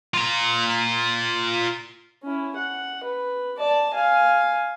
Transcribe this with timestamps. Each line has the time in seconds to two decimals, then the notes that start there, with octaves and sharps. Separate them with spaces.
0.14 F4 A#5
2.23 C#4 E4
2.56 F#5
3.04 B4
3.58 D5 A5
3.94 F5 G#5